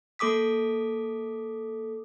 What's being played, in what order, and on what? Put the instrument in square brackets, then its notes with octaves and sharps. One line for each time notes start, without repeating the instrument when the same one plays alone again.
[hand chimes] A#3 A4 D6 D#6 B6